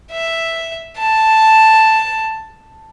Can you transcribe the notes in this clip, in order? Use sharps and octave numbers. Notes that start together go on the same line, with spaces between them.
E5
A5